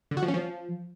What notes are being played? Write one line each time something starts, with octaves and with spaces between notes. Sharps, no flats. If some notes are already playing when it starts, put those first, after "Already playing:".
D3
F#4
F3
C#4
F3